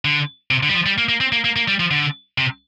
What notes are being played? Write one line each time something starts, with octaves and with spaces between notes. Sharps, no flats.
D3
C3
D3
G3
F3
G3
A#3
A#3
C4
A#3
A#3
A#3
G3
F3
D3
C3